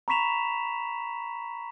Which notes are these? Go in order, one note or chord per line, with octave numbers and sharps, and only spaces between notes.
A#5 B5 C#6 B6 E7 F7